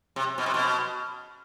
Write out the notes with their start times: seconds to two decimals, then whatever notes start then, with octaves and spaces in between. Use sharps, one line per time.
0.16 C3
0.38 B2
0.46 C3
0.54 B2